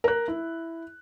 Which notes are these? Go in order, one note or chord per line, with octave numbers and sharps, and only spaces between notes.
A#4 F#6
E4